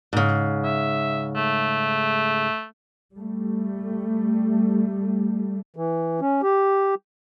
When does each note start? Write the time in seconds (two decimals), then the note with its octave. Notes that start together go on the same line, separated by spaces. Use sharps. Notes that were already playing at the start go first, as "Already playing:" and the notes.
0.13 G#2 C#3
0.64 E5
1.36 A3
3.12 G3 A3
5.76 E3
6.21 C#4
6.43 G4